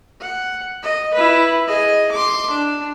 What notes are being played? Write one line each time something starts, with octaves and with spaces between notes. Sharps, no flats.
F#5
D#5
E4 B4
G#4 D#5
C6 D6
D4